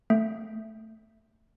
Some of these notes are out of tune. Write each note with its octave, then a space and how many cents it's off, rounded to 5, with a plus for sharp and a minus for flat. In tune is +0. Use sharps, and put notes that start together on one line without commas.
A3 +5